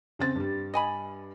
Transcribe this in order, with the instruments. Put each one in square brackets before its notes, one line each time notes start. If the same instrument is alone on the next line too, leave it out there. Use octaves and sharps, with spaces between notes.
[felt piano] C#3 C4 A6
G2 G3
[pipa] D#5 G#5 B5